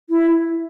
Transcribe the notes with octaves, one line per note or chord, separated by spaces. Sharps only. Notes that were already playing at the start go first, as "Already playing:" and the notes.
E4